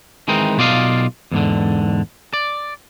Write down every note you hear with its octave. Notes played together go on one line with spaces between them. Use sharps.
D#3 E3 G#3 C4 D#4
B1 B2 F4 D5 D#5 F5
E2 G#2 D3
D5